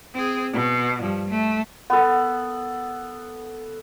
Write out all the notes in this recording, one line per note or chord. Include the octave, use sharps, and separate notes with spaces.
C4 G#4
B2
G2 F3
A3
B3 A4